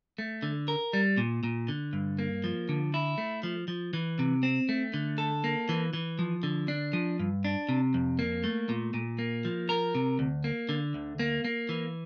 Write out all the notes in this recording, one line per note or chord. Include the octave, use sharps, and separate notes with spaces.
A3
D3
A#4
G3
A#2
A#2
D3
G2
A#3
F3
D3
E4
A3
F3
F3
E3
C3
C4
A3
D3
A4
A#3
E3
E3
F3
D3
D4
F3
G2
D4
C3
F2
A#3
A3
A#2
A#2
A#3
F3
A#4
C3
D2
A#3
D3
D2
A#3
A#3
E3